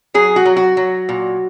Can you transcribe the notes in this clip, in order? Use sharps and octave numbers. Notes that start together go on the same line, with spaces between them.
F#3 G#4
F#4
F#3
F#4
F#3
A#2